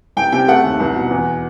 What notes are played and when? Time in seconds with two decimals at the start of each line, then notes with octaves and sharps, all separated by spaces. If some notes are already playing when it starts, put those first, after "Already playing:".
0.17 C2 G5
0.32 C3 G5
0.48 A3 F#5
0.64 D#2
0.80 C2
0.95 B2
1.11 E2